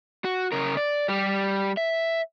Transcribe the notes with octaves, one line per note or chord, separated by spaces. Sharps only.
F#4
C#3 A#4
D5
G3 G4
E5